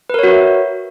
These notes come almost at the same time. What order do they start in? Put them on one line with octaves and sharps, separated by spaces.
B4 A#4 C#5 F#4 E5